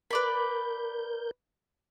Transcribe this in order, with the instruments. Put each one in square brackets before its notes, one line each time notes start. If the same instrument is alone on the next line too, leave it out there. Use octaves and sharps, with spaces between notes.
[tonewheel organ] A#4 G6 [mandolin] B4 D5 B5